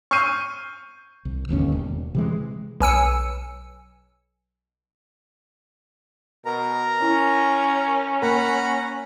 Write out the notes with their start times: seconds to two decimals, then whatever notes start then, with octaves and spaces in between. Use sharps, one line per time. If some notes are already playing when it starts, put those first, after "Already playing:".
0.11 C#6 E6 F6 G6 C7 D#7
1.25 C2
1.49 D1 G1 D#2 C#4
1.72 E1
2.15 C3 E3 G#3
2.81 B1 G#5 E6 C#7
6.45 B2 A#4 A#5
7.02 C#4 E4
8.22 A#3 A#4 F#5 A#5 B5